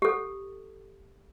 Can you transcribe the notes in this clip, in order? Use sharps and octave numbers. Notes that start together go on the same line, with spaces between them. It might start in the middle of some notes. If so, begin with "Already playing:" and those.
G4 A4